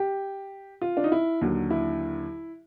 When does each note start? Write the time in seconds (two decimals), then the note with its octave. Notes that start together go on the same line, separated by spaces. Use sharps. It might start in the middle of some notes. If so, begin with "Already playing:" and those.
Already playing: G4
0.81 F4
0.97 D4
1.04 D#4
1.12 E4
1.41 D#2 D3 F#3
1.70 E4